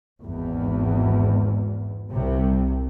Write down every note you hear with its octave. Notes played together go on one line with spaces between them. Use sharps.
G#1 E2
C2 C3